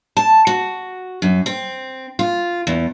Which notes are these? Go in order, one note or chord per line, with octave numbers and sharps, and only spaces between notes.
A5
F#4
F#2
C4
F4
E2